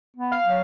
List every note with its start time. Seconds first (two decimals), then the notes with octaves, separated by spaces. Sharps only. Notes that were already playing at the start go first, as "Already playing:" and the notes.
0.17 B3
0.32 F5
0.46 F#3